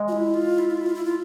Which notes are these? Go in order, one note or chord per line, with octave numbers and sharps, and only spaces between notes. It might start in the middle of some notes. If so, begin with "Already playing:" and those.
Already playing: G#3
F4
E4
F4
E4
F4
E4
F4
E4
F4